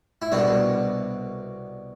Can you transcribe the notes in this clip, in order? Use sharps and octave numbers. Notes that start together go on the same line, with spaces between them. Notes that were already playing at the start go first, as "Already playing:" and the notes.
E4
C2 B2 D4